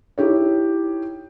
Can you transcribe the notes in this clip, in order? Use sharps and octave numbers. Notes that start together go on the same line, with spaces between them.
D#4 E4 G4 C#5